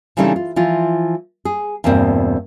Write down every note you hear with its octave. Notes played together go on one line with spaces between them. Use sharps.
C#3 E3 G3 A3 C4 D#4
F4
E3 F3 F4
G#4
E2 G2 B2 A#3 C4